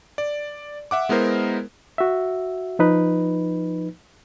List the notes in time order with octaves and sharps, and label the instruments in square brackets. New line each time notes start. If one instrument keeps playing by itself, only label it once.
[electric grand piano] D5
E5 F#5 D6
G#3 B3 E4 A#4 C5
[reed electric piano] F#4 E5
F3 D#4 B4